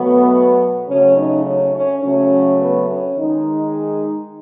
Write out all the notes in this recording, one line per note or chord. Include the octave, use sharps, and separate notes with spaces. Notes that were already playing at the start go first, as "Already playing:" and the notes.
Already playing: B2 F#3 A3 B3
C#3 F#3 A3 C#4
D#4
C#4
C#4
C#3 F#3 A3 C#4
B3
C#4
D#3 G#3 D#4